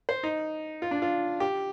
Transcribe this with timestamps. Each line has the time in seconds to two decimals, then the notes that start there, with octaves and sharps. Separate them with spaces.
0.09 C5
0.23 D#4
0.82 F4
0.91 D4
1.02 F4
1.40 G4